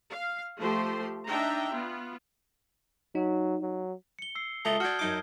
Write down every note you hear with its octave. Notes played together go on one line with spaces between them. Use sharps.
F5
F3 A3 G4 C5 C6
D4 D#4 E5 G5 A#5
B3 F4
F#3 D#4
F#3
C#7 G7
E6 C7
C#2 A3 A5 A#5 D#6 G7
D4 F#4 F6 G6 G#6
F#2 D#4 D6